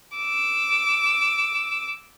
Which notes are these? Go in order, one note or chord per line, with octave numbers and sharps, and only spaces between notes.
D6 E6